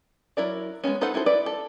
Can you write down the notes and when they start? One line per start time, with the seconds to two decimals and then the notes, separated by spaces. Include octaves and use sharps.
0.37 F#3 E4 A#4 D5
0.84 G#3 A3 B3 C#4
1.01 D#4 A4 B4 C5 F#5
1.14 D#4 E4 F#4 A4 C5
1.26 E4 B4 D5
1.46 A4